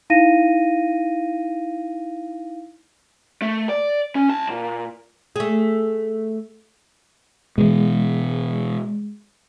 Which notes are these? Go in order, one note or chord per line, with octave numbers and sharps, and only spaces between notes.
D#4 E4 F5 A#6 D#7
A3
D5
C#4
C2 A5
A#2
A3 G#4
B2 E3 G#3